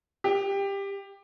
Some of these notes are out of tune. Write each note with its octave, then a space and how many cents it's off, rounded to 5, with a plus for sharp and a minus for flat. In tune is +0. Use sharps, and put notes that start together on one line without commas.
G4 +15